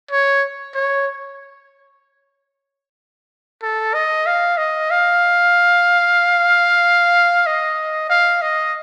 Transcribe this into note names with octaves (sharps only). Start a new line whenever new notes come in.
C#5
C#5
A4
D#5
F5
D#5
F5
D#5
F5
D#5